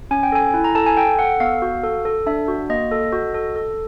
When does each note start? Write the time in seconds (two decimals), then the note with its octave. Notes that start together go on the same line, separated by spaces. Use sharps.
0.11 C#4 G#5
0.23 G5
0.32 A4 G#5
0.54 E4
0.64 A#5
0.75 A4 A5
0.86 G#5
0.97 A4 G5
1.19 A4 F#5
1.40 B3 F5
1.62 F#4
1.84 A4
2.05 A4
2.26 D4 E5
2.48 F#4
2.69 A#3 D#5
2.91 A4
3.12 F#4
3.34 A4
3.56 A4